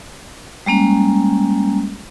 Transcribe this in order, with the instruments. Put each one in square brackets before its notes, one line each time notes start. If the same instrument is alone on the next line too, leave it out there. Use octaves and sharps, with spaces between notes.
[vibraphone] G3 G#3 A#3 C#4